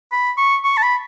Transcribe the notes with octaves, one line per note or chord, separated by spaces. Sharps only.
B5
C#6
C#6
A5
B5